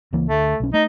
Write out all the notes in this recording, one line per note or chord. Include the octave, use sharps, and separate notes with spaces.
C#2 E3 A#3
D2 A3
B1 C#4
A3 D#4